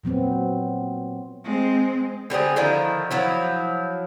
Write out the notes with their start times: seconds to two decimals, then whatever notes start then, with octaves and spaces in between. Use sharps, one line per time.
0.04 A#2 F#3 B3 C4
1.45 G#3 C4
2.30 D3 G3 C4 G#4
2.56 D3 D#3 F3 E4
3.11 F3 F#3 E4